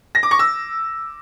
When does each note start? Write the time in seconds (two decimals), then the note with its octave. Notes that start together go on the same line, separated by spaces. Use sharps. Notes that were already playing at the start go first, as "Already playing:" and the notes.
0.15 A#6
0.23 D6
0.31 C#6
0.39 E6